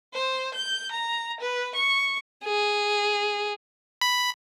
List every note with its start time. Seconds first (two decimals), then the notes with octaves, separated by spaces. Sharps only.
0.14 C5
0.55 G6
0.92 A#5
1.41 B4
1.76 C#6
2.45 G#4
4.01 B5